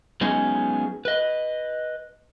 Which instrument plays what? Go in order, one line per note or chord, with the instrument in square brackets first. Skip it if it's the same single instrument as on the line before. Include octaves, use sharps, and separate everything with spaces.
[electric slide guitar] F#3 G#3 B3 C#4 D#4 G#4
B4 D#5